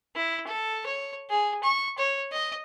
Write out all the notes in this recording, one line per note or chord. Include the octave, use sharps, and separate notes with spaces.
E4
A4
C#5
G#4
C#6
C#5
D#5